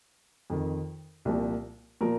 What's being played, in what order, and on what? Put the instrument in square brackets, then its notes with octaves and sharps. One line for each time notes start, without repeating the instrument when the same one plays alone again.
[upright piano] F2 D#3
C2 A#2 F3
A#2 F3 A#4